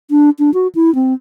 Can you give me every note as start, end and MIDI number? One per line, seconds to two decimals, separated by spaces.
0.11 0.30 62
0.39 0.53 62
0.54 0.67 66
0.75 0.93 64
0.95 1.14 60